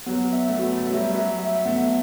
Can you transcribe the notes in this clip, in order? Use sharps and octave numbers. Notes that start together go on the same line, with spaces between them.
F#3 B3
E5
A3
B3 F#4
A3
F#3 E5
G3
F#3 E5
E5
A3 B3